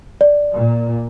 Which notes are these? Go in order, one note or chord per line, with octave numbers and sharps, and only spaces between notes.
D5
A#2